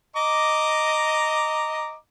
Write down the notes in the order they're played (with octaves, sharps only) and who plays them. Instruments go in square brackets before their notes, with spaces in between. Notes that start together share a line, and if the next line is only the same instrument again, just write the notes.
[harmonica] D#5 A#5 D6